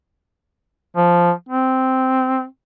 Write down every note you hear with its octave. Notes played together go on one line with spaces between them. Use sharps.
F3
C4